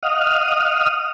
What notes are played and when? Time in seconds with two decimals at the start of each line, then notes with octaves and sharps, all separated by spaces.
0.03 D#5 F5 F#5 D#6 F6